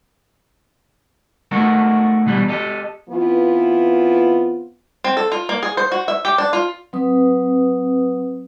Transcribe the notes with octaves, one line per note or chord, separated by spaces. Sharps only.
A3 D#4 F#4 A4 A#4
B2 E3 G3
G4 A4 D#5
E3 B3 C4 F4
C4
A4
F4
A#3
G#4
C5
F#4
E5
G4
D4
F4
F#3 C4 B4 D#6